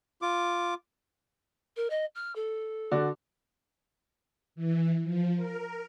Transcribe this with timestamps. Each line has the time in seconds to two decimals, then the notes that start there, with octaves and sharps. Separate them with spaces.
0.22 F4 D6
1.76 A#4
1.90 D#5
2.15 F6
2.36 A4
2.91 D3 F#4 D5
4.55 E3
5.03 F3
5.36 A#4